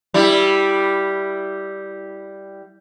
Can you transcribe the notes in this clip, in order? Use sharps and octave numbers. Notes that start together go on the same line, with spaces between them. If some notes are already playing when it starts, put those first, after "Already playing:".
G3 E4